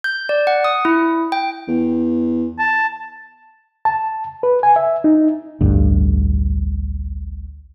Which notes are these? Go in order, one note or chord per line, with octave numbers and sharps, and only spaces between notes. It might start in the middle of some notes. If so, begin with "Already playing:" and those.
G6
D5
F#5
D#6
E4
G5
E2
A5
A5
B4
G#5
E5
D#4
A1 D2 G2